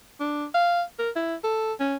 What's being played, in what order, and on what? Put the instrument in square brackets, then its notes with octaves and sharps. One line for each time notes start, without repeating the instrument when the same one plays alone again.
[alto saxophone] D4
F5
A#4
E4
A4
C#4